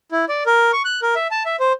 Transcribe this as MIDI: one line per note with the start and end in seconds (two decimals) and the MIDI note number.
0.12 0.25 64
0.29 0.44 74
0.46 0.71 70
0.73 0.82 85
0.85 1.00 90
1.02 1.15 70
1.15 1.27 76
1.31 1.43 81
1.45 1.56 76
1.60 1.73 72